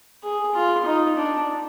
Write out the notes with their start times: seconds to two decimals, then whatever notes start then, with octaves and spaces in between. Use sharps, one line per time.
0.23 G#4
0.55 F4
0.85 D#4
1.16 D4